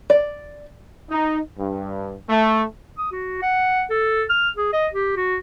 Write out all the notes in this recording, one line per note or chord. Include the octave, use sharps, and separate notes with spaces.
D5
D#4
G2
A3
D#6
F#4
F#5
A4
F6
G#4
D#5
G4
F#4